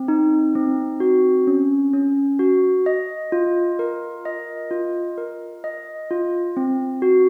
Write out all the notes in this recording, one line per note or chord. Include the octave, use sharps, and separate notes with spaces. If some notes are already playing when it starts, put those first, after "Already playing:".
Already playing: C4
D#4
C4
F#4
C#4
C#4
F#4
D#5
F4
A#4
D#5
F4
A#4
D#5
F4
C4
F#4